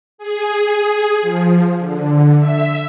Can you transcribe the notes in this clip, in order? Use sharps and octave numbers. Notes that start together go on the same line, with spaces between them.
G#4
F3
D3
E5